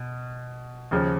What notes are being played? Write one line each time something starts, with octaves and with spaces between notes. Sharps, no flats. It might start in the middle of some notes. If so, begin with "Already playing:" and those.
Already playing: B2
D#2 C#3 F3